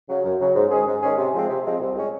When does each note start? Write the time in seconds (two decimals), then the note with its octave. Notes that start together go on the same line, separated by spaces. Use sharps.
0.09 C#3 F#3
0.24 F#2
0.40 C#3 F#3
0.56 G#2
0.71 D#3 G#3 C#4 G#4
0.87 G#2
1.02 D#3 G#3 C#4 G#4
1.18 C3
1.34 F3 G#3 C4
1.49 C3
1.65 F3 G#3 C4
1.80 C2
1.96 A#2 G#3 C#4